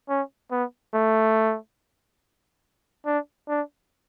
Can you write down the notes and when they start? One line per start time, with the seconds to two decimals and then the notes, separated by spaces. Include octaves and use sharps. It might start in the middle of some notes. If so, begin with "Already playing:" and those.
0.09 C#4
0.51 B3
0.94 A3
3.05 D4
3.48 D4